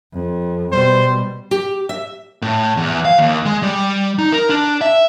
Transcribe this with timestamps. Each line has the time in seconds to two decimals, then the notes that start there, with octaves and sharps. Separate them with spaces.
0.14 F2
0.72 B2 G3 C5
1.51 G4
1.89 E5
2.42 A2
2.77 E2
3.05 F5
3.19 D#2
3.46 G#3
3.63 G3
4.18 D#4
4.32 A#4
4.49 D4
4.81 E5